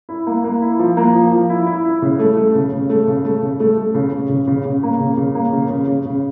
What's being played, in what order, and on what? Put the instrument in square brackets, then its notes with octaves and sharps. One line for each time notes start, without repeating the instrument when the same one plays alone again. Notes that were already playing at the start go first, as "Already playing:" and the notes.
[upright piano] E4
A#3
A#3
E4
F3
A#3
F3
F3
E4
E4
E4
C#3
A3
A3
C#3
C#3
A3
C#3
A3
C#3
A3
A3
C#3
C#3
C#3
C#3
C#3
A#3
C#3
C#3
A#3
C#3
C#3
C#3
C#3